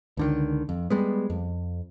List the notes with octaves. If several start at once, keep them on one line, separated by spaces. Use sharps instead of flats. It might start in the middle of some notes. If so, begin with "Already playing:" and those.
C#2 D3 D#3
F2
G3 G#3 B3
F2